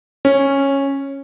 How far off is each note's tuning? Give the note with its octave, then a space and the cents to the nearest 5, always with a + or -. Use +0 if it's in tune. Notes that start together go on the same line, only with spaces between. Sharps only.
C#4 -10